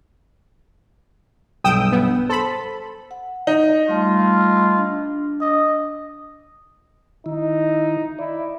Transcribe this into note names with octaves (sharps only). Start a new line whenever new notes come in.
B1 G2 G5 D#6 E6
B3
A4 C5 B5
F#5
D#4
G3 A3 F4 A5
D4
D#5
D#3 D#4 E4
E4 D5